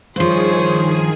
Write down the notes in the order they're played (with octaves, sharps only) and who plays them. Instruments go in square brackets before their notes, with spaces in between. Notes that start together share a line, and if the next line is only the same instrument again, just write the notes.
[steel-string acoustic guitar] G2 F3 [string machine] D#3 G#4 [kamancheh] C5 C#5